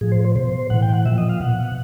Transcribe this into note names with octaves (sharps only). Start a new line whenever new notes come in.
A2 F3 G#4
C5
C5
B2 C5
A2 E3 F#5
G5
F#5
A#2 F3 E5
D#5
F5
B2 F#5